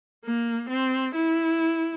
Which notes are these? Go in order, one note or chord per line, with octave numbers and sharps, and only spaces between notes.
A#3
C4
E4